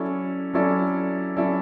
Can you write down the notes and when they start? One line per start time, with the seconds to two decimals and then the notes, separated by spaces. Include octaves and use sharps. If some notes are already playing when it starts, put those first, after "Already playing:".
Already playing: F#3 C#4 E4 A4 D5
0.53 F#3 C#4 E4 A4 D5
1.37 F#3 C#4 E4 A4 D5